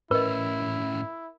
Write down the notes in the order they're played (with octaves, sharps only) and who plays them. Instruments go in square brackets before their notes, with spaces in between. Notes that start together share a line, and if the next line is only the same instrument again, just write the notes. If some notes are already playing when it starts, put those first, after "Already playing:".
[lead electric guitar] A2 C#4 [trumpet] E4 [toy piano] A#4 D#5 [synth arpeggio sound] B4